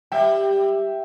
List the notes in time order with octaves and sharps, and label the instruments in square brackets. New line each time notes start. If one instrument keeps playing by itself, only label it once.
[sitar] G3 [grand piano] E5 G5